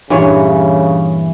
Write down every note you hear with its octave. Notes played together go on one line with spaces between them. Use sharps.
G2 A#2 C#3 E3 C#5